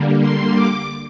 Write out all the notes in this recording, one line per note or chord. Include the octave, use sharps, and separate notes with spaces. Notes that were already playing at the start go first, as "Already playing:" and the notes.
Already playing: D3 G3 A#3
C6
D6